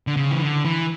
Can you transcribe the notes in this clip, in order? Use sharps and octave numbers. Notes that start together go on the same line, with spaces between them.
D3
C#3
E3
D3
E3